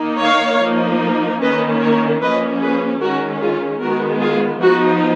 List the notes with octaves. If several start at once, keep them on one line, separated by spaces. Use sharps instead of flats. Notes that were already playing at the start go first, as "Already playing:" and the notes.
Already playing: D#3 A#3 D#4
C#5 F5
F3 A#3 D#4
D#3 A#3 C#4 B4 D#5
A#4 C#5
F3 A#3 C#4 B4 D#5
G#4 B4
D#3 G#3 C#4 F#4 A#4
F4 G#4
D#3 G#3 B3 F#4 A#4
F4 G#4
F3 B3 D#4 F#4